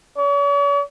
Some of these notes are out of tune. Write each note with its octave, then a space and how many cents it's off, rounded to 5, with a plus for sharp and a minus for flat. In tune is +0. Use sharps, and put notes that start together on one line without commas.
C#5 +45